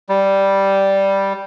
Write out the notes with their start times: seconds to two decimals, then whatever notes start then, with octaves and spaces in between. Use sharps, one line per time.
0.09 G3